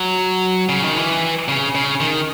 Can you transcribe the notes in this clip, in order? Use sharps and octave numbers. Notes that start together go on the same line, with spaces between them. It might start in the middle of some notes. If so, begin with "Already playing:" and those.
Already playing: F#3
C#3
D#3
E3
C#3
C#3
D#3